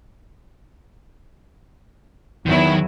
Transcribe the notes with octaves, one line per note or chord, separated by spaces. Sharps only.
E2 D#3 F#3 E4